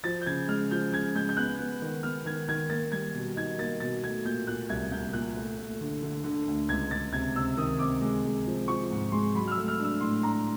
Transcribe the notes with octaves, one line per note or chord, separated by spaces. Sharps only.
F3 A6
G6
C#3 G#6
G#3 F6
F3 G6
C#3 G#6
G#3 G6
G6
B3 F#6
B3
D#3
B3 F6
D#3 G#6
D#3 G#6
A#3 A6
G3 G#6
B2
D#4 G#6
A#3 A6
B2 A6
A3 G#6
A#2 G6
A#2 F#6
C2 G#6
C2 G6
A#2 F#6
A3
A3
D3
D3
D3
D2
C#2 G#6
C#2 A6
C3 G#6
C3 E6
D#3 D#6
C3 D6
G#3
G#3
F3
F3 C#6
G#2
G#3 C6
F#3 B5
F6
E6
A3
F6
D4 E6
A2 C6
D4 A#5